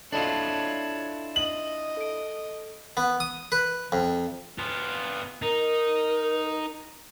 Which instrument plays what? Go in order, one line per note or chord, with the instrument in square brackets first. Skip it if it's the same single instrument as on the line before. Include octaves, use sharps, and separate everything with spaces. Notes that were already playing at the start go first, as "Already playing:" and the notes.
[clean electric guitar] D4 E4 F4 [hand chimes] A4 D#5 A5 [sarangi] C#5
[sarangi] D#5 [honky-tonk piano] F#7
[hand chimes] A4 D7
[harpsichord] B3
D#6
B4
F2
[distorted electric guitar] B3 F4
[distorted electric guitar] D#4 [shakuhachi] A#4